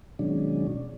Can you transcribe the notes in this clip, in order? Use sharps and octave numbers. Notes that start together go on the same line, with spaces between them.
B2 D#3 F#3 G#3 C#4 D4